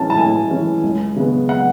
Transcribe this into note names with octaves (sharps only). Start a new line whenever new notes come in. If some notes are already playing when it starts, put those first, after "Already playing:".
Already playing: A2 E3 G#3 C#4 A5
A5
A2 G#5
E3 G#3 C#4
C#2
C#3 G#3 B3
F#5